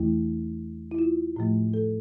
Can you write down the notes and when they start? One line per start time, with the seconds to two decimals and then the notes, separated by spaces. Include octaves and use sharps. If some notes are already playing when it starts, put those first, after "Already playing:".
Already playing: E2 E3 A3 E4
0.91 E4
0.99 F4
1.36 A2 F3 A3
1.74 A4